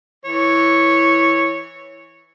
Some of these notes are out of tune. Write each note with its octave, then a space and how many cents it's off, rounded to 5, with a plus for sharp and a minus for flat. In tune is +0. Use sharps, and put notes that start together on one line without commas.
E3 +0 C#5 -5